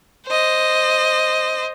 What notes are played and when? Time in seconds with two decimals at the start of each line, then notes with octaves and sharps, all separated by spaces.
0.28 C5 D#5